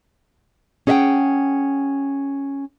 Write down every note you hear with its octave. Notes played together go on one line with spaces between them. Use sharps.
C#4 G#4 D#5 E5 F#5 G5